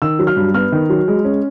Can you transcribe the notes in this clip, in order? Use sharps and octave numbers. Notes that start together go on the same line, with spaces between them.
D#3 E6
F#3
F6
G2
B3 F6
D#3
F#3
G#3
C#4